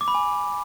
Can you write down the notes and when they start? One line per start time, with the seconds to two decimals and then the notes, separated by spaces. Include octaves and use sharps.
0.01 D6
0.08 B5
0.15 G#5